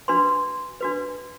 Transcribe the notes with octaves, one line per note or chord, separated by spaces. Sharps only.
D4 F#4 B4 C6
D4 F#4 B4